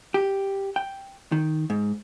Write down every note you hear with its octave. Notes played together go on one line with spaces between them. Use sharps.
G4
G5
D#3
G#2